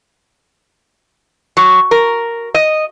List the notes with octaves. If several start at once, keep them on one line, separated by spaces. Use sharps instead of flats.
F#3
A#4
D#5